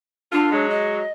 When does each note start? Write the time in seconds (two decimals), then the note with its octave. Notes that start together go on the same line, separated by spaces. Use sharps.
0.33 D3 D4 F4
0.52 F#3 G#3
0.70 D#5